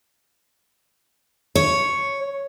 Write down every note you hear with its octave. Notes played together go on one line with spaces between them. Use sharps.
C#5